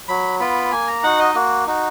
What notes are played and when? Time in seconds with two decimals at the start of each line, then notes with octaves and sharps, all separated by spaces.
0.08 F#3 B5
0.40 B3 F4 B5
0.72 A#3 G#5
0.88 A#5
1.03 D#4 F#4 F#5
1.19 D#5
1.35 A#3 F#4
1.67 D#4 F#4